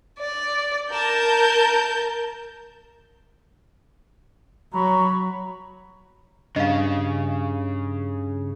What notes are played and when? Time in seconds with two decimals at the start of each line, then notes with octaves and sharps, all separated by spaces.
0.19 D5
0.92 A#4 A5 G6
4.73 F#3 A#5 B5 C#6
6.56 G2 C#3 D#5 F5